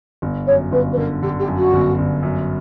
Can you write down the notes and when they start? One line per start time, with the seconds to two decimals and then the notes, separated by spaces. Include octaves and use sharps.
0.22 G1
0.47 F#2 C#5
0.72 G1 B4
0.93 B4
0.97 D3 A#4
1.22 D3 G4
1.39 G4
1.48 F#2
1.57 F#4
1.73 G1
1.98 G1
2.23 F#2